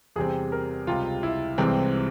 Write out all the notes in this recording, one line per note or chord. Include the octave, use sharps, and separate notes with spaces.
E2 C3 G3 C4 G#4
A#4
C#2 C3 G3 F4
E4
C2 C3 E3 G#3 C4